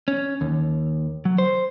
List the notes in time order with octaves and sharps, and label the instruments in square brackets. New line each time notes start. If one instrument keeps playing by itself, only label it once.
[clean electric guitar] C#4
D#2
F#3
C5